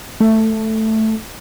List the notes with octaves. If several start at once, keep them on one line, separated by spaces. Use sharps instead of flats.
A3